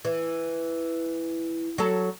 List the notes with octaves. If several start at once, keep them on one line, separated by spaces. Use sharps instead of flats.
E3
F#3 A4